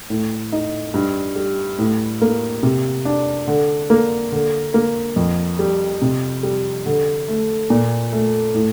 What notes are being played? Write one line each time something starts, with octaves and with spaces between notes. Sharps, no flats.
A2
D#4
G2
G3
A2
A#3
C3
D4
D3
A#3
D3
A#3
F2
G3
C3
G3
D3
A3
A#2
A3
A2